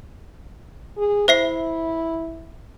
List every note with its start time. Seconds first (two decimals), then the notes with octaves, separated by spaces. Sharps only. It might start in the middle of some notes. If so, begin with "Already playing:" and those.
0.97 G#4
1.28 E4 C5 E5 C7